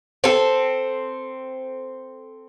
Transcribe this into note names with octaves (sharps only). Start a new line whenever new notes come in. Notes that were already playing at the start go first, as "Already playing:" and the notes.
C4 A4